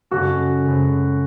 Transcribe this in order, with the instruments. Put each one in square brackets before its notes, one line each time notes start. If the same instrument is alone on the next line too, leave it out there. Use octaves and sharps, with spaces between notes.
[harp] F#2 C#3 G#3 D#4 A4 [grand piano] F#4
[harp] F#2 C#3 G#3 D#4 A4